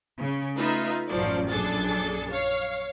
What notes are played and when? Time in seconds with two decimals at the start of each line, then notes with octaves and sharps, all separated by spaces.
0.18 C#3
0.56 A3 D#4 F4 B4 E5
1.09 A1 F#2 F3 F#3 D5
1.49 A#1 F#2 D4 G#4 A4 A6
2.30 C#5 F5